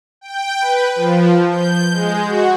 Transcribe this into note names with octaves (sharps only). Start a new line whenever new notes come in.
G5
B4
F3
G6
G#3
F#4